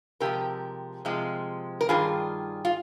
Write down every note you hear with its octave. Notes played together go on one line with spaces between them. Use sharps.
C3 F3 G#3 G4 A#4
C3 F3 G#3
A#4
G2 D#3 G3 F4 G#4
F4